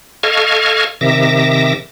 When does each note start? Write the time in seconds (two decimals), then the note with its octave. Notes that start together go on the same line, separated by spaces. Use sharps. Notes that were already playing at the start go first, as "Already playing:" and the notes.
0.23 A4 D#5 F5 C#6 F6 G#6
1.01 C3 D#3 E5 D6 A#6